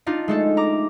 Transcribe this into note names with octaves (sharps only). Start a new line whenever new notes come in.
D4 D#4 F4
G#3 A3 A4
A#5 D6